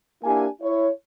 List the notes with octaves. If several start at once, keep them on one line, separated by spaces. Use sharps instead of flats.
A#3 D4 E4 G4 G#5
E4 C#5